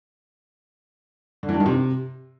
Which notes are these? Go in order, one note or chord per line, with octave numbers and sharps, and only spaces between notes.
D3
E3
G2
D#3
C3